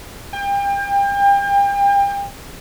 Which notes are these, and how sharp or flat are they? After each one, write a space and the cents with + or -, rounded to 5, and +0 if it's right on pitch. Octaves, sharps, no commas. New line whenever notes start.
G5 +35